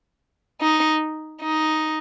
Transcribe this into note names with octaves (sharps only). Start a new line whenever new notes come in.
D#4
D#4